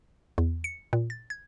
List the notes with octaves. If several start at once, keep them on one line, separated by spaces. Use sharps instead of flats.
E2
C#7
A#2
A6
G#6